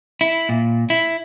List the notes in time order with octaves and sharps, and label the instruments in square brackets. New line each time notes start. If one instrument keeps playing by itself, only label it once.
[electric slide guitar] E4
A#2
E4